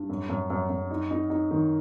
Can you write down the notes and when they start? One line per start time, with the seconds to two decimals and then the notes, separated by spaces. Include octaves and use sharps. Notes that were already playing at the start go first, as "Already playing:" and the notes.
Already playing: G2
0.09 F#2
0.29 F#2
0.50 F#2
0.70 F#2
0.91 D#4
1.11 D#4
1.30 D#4
1.51 D#3